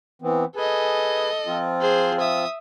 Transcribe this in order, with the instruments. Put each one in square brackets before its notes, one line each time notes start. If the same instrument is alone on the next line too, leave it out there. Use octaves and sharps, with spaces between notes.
[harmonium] E3 B3 C4
[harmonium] G#4 B4 G#5 [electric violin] A4 D#5
[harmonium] F3 C4 F4
[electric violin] G#4 C5
E5 D#6